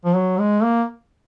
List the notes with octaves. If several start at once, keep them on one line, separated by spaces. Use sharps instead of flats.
F3
F#3
G#3
A#3